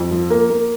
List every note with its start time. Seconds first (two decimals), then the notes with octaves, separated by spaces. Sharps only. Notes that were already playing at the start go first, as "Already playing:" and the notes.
Already playing: F2
0.11 F3
0.30 A#3
0.50 A#3